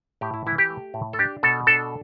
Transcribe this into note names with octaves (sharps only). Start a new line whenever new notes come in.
A2 G4
E4
E3 E4
G4
A3
A2
A4
D4 G4
B2 A4
D4 A4